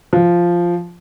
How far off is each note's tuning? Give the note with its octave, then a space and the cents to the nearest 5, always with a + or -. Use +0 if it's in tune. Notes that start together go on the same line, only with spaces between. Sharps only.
F3 -5